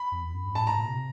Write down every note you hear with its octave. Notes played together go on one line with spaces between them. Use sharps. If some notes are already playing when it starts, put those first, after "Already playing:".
Already playing: B5
F2
E2
F#2
G2
A2 A5
G#2 A#5
A#2
C3